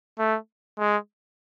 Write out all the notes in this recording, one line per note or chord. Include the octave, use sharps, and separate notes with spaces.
A3
G#3